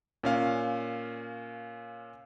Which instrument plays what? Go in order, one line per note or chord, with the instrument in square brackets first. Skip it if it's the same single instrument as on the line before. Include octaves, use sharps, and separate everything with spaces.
[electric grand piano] A#2 C#4 F5